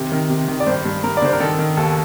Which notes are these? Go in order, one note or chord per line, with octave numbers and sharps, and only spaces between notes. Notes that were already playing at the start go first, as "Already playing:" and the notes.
Already playing: C3 D#3
D#3
C3
D#3
D5
G2 C5
G2
G2 A#4
D5
D3 C5
A#4
D#3 A4
D#3
D#2 A4